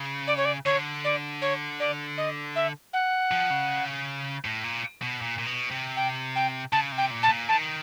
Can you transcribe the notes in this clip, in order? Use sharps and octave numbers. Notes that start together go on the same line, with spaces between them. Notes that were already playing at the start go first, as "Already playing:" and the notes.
Already playing: C#3
D5
C#5
D5
D3 C#5
D5
C#5
D5
D#5
E5
F#5
F3
C#3
A2
A#2
B2
A#2
A#2
B2
C3
G5
G5
C#3 A5
C3
G5
A#2
A5
A#2
D#3 A5